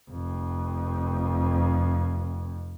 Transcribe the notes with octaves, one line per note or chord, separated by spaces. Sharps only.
F1 F2